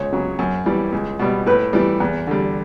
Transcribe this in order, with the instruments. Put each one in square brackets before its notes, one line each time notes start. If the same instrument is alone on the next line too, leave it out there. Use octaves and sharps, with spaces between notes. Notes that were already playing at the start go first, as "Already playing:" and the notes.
Already playing: [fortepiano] C#2 C#5
C#3 F#3
F#2
E3 G3
C#2
B2 G3
A2 B4
E3 G3
E2
D3 G3